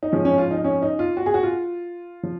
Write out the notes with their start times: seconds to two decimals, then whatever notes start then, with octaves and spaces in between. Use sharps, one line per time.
0.03 D#4
0.12 G#2 F3 C#4
0.25 C#4
0.38 F4
0.51 D#4
0.64 C#4
0.82 D#4
0.99 F4
1.17 F#4
1.26 G#4
1.34 F#4
1.43 F4
2.23 F3